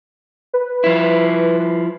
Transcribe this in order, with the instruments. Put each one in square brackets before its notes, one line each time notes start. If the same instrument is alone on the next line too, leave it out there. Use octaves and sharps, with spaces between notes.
[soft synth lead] B4
[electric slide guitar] F3 E4